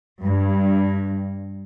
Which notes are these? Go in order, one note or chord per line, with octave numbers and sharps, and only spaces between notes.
G2